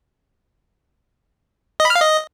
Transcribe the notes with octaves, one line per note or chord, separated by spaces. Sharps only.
D#5
B5
F6
F5
D#5